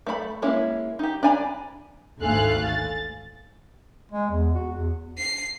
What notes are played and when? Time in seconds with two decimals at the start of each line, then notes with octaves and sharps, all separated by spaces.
0.06 A3 C5 B5
0.42 G#3 A#3 C#4 E4
0.99 D#4 G4
1.23 D4 D5 G#5 A#5 B5
2.19 G#1 D2 A3 F5 G#5 F#6
2.65 A6
4.12 G#3
4.30 E2
4.55 F#4
4.76 E2
5.18 C7